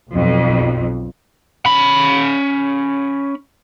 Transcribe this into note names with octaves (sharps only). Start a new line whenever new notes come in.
B1 F2
C#4 B5